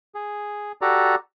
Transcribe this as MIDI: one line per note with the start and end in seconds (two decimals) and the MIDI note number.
0.15 0.72 68
0.82 1.15 66
0.82 1.15 67
0.82 1.15 69
0.82 1.15 74
0.82 1.15 82